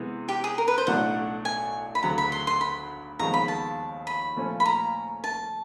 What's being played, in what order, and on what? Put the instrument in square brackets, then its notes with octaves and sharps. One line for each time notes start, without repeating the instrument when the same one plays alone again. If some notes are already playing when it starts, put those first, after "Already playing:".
Already playing: [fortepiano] C3 E3 G#3 B3
[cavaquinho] G4
G#4
A#4
B4
C5
[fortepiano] B1 A2 F#3 A3 D4 [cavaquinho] F#5
[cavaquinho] G#5
B5
[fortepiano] D2 C#3 F#3 [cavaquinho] A#5
[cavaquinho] B5
C6
C6
B5
[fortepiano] D#2 C#3 F3 G#3 B3 [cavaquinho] A#5
[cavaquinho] B5
A5
B5
[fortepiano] A#2 F3 A3 C#4
[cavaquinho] B5
A#5
A5